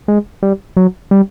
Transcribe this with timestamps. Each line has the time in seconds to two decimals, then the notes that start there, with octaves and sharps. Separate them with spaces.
0.08 G#3
0.42 G3
0.77 F#3
1.11 G3